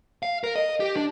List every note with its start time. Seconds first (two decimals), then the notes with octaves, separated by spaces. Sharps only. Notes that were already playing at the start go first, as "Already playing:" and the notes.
0.23 F5
0.44 A#4
0.56 D#5
0.80 G4
0.96 D4